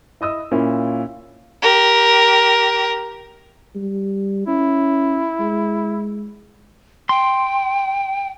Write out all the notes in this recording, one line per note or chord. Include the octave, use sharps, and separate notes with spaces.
E4 D#5 D#6 E6
A#2 A#3 C#4 E4
G4 A#4
G3
C#4 E4
G#3
G5 C6